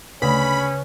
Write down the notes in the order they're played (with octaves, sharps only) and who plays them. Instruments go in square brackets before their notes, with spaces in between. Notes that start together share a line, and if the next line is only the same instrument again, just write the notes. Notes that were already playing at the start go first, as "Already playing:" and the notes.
[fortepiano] D2 [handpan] C#3 B4 [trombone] C#4 [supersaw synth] B5